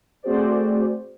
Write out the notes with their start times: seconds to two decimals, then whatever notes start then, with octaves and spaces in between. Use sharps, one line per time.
0.23 A3 C4 F#4 G#4 C5 D5